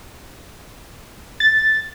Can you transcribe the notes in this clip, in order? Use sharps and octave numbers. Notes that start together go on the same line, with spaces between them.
A6